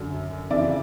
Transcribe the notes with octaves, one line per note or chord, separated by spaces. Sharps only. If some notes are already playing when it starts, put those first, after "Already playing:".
Already playing: F#2 D3
F2 C#3 E3 D5 E5